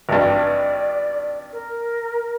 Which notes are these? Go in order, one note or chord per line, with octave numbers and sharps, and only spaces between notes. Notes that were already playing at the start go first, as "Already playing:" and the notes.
G#1 G2 D5
A#4